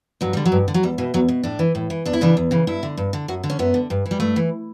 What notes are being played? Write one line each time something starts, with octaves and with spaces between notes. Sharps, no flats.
G2 F#3
D3 G3
F#3
G2
D3
F#3
E2 G3
B2 E3
E2 F#3
B2
A2 D4
E3
A2
E3
E2 D4
E4
C#3 E3 D4
E2
C#3 E3
G2 E4
D3
G2
D3
F#2 F#4
D3
C#4
F#2 B3
D3
G2
E3
G3
G2 A3
E3